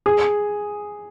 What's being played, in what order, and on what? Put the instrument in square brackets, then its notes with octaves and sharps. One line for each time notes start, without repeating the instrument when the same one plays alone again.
[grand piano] G#4